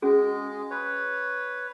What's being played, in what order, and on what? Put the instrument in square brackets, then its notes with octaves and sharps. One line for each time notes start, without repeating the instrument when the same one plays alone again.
[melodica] G#3 [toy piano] C#4 F#4 G#4
[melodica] B4 C#5